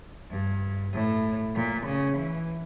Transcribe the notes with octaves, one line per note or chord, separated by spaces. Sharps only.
G2
A2
A#2
C#3
E3